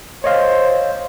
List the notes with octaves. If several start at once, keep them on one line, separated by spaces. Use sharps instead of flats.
C5 C#5 D#5 F5